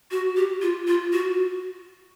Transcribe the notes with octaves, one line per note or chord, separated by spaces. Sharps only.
F#4
G4
F4
F4
F#4